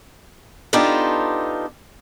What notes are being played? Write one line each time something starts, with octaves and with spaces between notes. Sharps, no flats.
B3 D4 D#4 F4 G4 A4